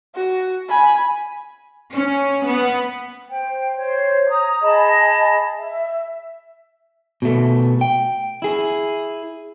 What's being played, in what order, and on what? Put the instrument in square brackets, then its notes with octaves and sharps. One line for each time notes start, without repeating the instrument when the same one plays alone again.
[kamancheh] F#4
G#5 B5
[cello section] C#4
B3
[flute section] C5 G5
C5 C#5
A#5 D#6
G#4 D#5 A5 B5
E5
[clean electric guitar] B2 A3
G5
E4 G#4